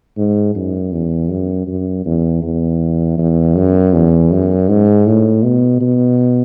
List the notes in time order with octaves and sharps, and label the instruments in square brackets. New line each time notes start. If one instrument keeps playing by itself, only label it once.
[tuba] G#2
F#2
E2
F#2
F#2
E2
E2
E2
F#2
E2
F#2
G#2
A2
B2
B2